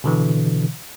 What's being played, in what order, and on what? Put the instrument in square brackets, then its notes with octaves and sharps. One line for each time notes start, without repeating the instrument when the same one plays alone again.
[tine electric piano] B2 D3 E3